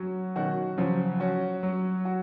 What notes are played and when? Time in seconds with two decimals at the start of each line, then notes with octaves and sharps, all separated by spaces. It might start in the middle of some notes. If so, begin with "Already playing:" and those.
Already playing: F#3 C#4 F#4
0.35 B2 D#3 C#4 F#4
0.78 C#3 F3 F#3
1.20 C#4 F#4
1.63 F#3
2.05 F#4